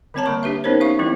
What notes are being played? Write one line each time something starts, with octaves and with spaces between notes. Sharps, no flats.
D3 G3 C4 C#5 A5 A#5
D3 A#3 C#6
D4 G4 B4 E5
B3 C#4 D#4 A#4 C5 C#5
D#4 G4 E5 F5 C#6
E3 G3 B3 C4 E4